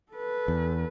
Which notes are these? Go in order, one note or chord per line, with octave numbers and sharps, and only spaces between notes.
A4 B4
E2